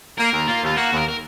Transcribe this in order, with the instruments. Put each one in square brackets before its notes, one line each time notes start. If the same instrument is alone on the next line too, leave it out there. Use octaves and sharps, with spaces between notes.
[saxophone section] A#3 [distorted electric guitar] A#4
[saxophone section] D#2
[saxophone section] A#3 [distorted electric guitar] F4
[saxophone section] D#2 [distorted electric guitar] F4
[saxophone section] A#3 [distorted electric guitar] F#4
[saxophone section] D#2
[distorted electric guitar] A#4
A#4